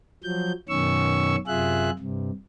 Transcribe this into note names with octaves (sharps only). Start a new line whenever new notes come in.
F3 F#3 G6
F#2 B2 D#3 C#4 C#6 E6
F#2 C3 F4 G#4 E5 F#6
G2 C3